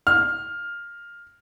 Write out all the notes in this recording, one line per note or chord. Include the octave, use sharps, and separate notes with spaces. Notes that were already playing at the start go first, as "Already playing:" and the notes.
F6